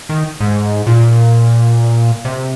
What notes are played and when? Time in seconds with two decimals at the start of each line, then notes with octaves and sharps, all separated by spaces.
0.09 D#3
0.40 G#2
0.87 A#2
2.25 C3